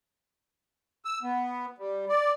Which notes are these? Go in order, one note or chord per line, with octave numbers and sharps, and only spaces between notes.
E6
B3
G3
D5